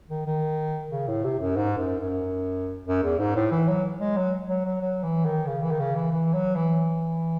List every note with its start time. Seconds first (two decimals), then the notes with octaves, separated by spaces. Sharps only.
0.10 D#3
0.26 D#3
0.91 C#3
1.07 A2
1.24 C3
1.40 F#2
1.56 G#2
1.78 F#2
2.00 F#2
2.86 F#2
3.03 E2
3.19 G#2
3.35 A2
3.51 E3
3.68 F#3
4.00 G#3
4.17 F#3
4.49 F#3
4.65 F#3
4.81 F#3
5.03 E3
5.25 D#3
5.46 C#3
5.62 E3
5.71 D#3
5.79 C#3
5.95 E3
6.12 E3
6.33 F#3
6.55 E3